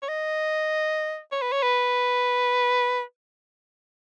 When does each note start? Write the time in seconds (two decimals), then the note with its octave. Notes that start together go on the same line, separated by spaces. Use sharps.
0.02 C#5
0.09 D#5
1.32 C#5
1.42 B4
1.52 C#5
1.63 B4